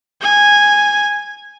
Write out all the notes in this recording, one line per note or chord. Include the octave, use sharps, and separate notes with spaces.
G#5